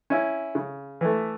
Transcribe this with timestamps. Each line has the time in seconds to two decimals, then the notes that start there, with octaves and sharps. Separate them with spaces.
0.10 C#4 E4
0.55 C#3
1.01 E3 A3